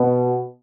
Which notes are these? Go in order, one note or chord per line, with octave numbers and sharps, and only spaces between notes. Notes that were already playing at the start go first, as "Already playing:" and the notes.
Already playing: B2